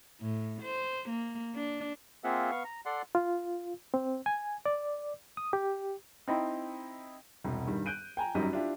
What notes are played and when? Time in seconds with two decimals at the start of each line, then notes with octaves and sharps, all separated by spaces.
0.21 A2
0.62 C5
1.09 A#3
1.55 D4
2.24 A#3 C4 F4 G#4 E5 F#5
2.51 B3 F5 C#6
2.64 A#5
2.86 A4 D5 F#5 C6
3.15 F4
3.94 C4
4.26 G#5
4.66 D5
5.37 D#6
5.53 G4
6.28 C4 D#4 E4 G5
7.44 E1 C2
7.67 G2 D#3 G3
7.86 F#6 G6 D7 D#7
8.17 G5 G#5 A#5
8.35 G#1 F#2 F#3 G3 D#4 D#7
8.53 D4 E4 F4 G4